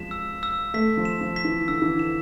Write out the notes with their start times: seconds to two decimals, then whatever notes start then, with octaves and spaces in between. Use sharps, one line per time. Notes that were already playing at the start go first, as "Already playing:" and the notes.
Already playing: F3 G#3 B6 E7
0.11 E6
0.43 E6
0.74 A3 B6
0.97 F3
1.05 E7
1.21 F3
1.36 B6
1.45 E3
1.68 D3 E6
1.82 E3
1.95 D3 E7